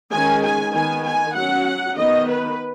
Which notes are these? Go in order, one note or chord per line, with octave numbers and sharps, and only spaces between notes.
D#3 G#3 C#4 G#5
G#5
D#3 B3 G#5
G#5
F#3 C#4 F#5
D#3 B3 D#5
B4